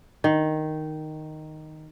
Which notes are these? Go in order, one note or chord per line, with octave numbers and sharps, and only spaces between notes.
D#3